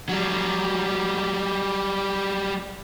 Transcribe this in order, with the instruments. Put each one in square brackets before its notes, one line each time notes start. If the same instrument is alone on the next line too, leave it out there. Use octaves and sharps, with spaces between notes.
[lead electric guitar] F#3 G3